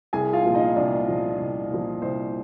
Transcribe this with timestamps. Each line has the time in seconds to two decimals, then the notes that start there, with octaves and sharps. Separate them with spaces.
0.13 C2 G#4 G#5
0.33 F4 F5
0.45 A#2 F3
0.55 D#4 D#5
0.76 C2 D4 D5
1.08 A#2 F3
1.39 C2
1.70 A#2 F3
2.02 C2 C5